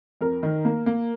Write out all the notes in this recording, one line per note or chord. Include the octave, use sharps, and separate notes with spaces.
F2 A#4
D#3
A#3
A#3